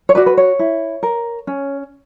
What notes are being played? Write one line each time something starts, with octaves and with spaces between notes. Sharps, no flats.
C#5
F#4 B4 D5
B4
C#5
E4
A#4
C#4